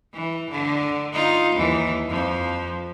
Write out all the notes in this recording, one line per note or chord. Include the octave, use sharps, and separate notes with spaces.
E3
D3
D#4 F4
D#2 E3
F2 F3